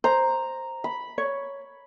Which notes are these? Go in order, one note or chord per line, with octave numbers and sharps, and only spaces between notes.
C5 A#5
B5
C#5